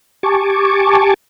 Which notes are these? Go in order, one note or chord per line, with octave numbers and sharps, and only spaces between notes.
G4 G#5 A5 C#6 D6